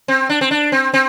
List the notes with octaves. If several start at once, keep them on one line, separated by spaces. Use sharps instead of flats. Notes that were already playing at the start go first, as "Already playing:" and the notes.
C4
D4
C4
D4
C4
C4